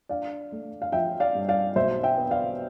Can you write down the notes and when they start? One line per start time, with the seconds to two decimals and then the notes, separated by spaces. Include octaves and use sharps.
0.09 D4 D5 F5
0.52 A3
0.82 F5
0.92 F3 E5 G5
1.20 D5 F5
1.35 G2
1.49 D5 F5
1.76 B1 C5 E5
2.03 E5 G5
2.18 B3
2.31 D5 F5